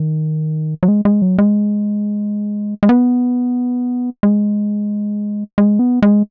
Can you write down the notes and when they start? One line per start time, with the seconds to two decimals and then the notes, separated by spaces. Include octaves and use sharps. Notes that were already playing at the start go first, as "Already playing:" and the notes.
Already playing: D#3
0.83 F#3
0.88 G#3
1.05 G#3
1.22 F#3
1.38 G#3
2.83 G#3
2.89 B3
4.23 G#3
5.58 G#3
5.79 B3
6.02 G#3